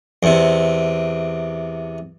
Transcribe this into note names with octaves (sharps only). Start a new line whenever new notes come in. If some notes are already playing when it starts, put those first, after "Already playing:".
E2 C3